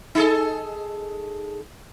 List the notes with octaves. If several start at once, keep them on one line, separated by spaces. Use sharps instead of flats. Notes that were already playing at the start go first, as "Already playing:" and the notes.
D#4 G#4 A4